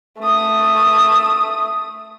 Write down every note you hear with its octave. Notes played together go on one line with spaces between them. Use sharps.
A3 D#6